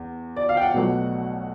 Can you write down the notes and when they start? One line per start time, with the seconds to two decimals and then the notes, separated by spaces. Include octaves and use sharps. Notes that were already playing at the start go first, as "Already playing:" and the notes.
Already playing: E2
0.36 D5
0.49 F5
0.57 G5
0.62 F#5
0.74 B1 B2 F#3 A3